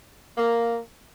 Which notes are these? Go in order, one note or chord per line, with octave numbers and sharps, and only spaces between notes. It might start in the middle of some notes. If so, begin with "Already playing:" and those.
A#3